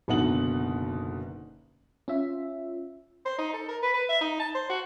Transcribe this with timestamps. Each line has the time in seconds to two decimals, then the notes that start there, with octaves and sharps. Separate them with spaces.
0.08 F#1 B2 D3 D#4 F#5 F#7
2.08 C#4 F4 E5
3.25 C5
3.38 D#4
3.53 A4
3.68 A#4
3.83 B4
3.94 B4
4.09 E5
4.21 D#4
4.40 A5
4.55 C5
4.70 F#4